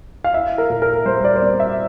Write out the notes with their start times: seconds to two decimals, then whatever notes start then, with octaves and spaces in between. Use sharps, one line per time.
0.24 F5
0.34 E4 E5
0.58 A#4
0.70 A#2
0.82 A#4
1.05 G3 C5
1.24 D5
1.36 C5
1.41 C4 D5
1.60 E5